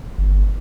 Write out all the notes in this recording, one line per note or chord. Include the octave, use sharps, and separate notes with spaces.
G1